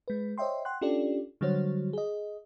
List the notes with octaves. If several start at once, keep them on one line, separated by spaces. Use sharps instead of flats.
G#3 B4
C5 C#5 D#5 E5 G5 C6
F#5 G5 C6 F#6
C#4 D4 F4 G4 A4 D5
D3 F#3 G3 F#4 C5 C#5
G#4 D#5